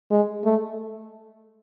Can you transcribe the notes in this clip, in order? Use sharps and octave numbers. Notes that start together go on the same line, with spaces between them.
G#3
A3